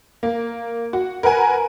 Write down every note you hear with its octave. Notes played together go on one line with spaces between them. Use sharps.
A#3
F#4
A#4 B4 F#5 G#5